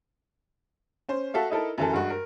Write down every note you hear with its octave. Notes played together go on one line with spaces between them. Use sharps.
C#4 C5
F#4 A4 E5 F5
D#4 E4 A4 A#4
F#2 E3 A4
G2 G#3 F#4
A#4